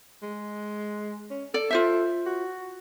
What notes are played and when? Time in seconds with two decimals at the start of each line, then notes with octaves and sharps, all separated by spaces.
0.22 G#3
1.30 C#4
1.54 A4 D5
1.70 F4 C5 E5
2.26 F#4